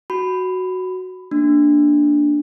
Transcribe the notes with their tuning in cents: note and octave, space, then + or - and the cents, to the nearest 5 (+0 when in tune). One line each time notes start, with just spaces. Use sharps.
F#4 +0 B5 +15
A#3 +0 D4 +0